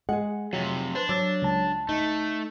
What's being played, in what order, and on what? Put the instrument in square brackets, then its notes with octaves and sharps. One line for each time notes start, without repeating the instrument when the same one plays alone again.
[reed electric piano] G#3 [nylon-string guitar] G#4 F#5
[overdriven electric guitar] F2 C3 [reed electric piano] F#3
[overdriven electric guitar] D4 [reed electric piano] B4 C5
[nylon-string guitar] F#3 [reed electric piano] D6 E6 A6
[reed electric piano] C#2 A5
[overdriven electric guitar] A3 [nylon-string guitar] D#4